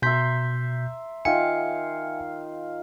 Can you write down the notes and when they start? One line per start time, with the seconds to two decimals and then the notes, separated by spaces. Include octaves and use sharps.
0.02 B2 E5 A#5 C6 G6 B6
1.25 D#3 F4 E5 F5 G#5 C#7